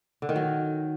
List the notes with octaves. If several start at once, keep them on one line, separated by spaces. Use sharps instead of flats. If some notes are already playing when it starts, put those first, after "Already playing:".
D3
D#3
F#3